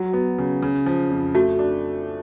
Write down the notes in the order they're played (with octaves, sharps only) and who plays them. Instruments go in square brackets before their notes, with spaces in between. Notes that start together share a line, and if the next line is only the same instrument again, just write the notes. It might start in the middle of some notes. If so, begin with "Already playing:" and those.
Already playing: [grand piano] F#3 [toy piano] F#4
[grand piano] B3
C#3
C#3
F3
F2
[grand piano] A3 [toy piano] F#4
[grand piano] D4